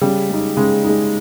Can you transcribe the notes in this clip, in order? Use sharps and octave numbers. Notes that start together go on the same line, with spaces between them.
C#3 G3
G#3 D#4
C#3 G#3
G#3 D#4